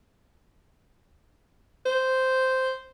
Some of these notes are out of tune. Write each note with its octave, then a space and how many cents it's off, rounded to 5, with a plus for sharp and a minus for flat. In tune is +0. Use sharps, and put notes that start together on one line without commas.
C5 -5